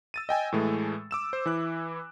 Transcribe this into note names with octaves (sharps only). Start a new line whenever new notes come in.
E6 A6 D#7
D#5 G5 G#5
A2 E3 G#3 A3
D6 E6 E7
C5
E3 E4 F#6